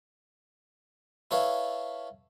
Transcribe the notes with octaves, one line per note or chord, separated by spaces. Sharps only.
E4 A4 B4 C#5 F5